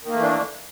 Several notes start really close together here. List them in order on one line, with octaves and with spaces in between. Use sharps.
D#3 A#3 A3 E3 D4